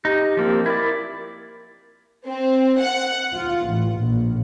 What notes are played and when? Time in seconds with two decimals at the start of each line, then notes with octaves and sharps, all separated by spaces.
0.05 D#4 G4
0.37 F3 A#3 C4
0.66 E4 A#4 D5
2.27 C4
2.80 F#5
3.34 F4
3.67 A1
3.99 A#1